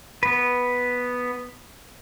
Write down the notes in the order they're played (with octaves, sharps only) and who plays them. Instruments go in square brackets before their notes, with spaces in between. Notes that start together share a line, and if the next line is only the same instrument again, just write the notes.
[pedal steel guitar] B3 B4